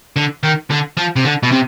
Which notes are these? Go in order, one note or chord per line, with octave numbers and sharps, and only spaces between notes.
D3
D#3
D3
F3
C3
D3
B2
C3